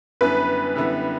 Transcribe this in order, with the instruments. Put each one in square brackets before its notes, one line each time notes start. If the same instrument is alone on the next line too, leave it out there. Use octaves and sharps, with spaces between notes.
[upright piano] F#2 D3 G3 B3 E4 [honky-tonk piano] B4
[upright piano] F#2 D3 G3 B3 E4